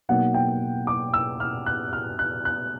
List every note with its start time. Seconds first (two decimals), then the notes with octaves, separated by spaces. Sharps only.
0.09 B2 F#3 A#3 D#4 F#5
0.34 G5
0.87 D6
1.14 E6
1.40 F6
1.66 F#6
1.93 F6
2.19 F#6
2.45 F#6